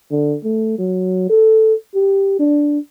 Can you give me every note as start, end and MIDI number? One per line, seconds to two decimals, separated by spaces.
0.11 0.37 50
0.44 0.75 57
0.78 1.24 54
1.30 1.74 69
1.95 2.34 67
2.39 2.79 62